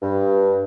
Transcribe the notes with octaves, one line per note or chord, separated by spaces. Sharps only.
G2